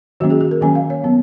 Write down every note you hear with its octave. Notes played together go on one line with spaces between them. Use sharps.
D#3 F#3 A#3 C#4 F#4
G#4
G#4
A#4
D#3 F#3 A#3 C#4 G#5
F5
C#5
F#3 B3